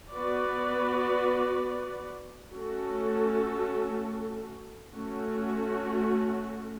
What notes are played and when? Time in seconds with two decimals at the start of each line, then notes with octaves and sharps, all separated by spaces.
0.13 B3 F#4 B4 D5
2.53 A3 C#4 F#4 A4
4.95 A3 C#4 F#4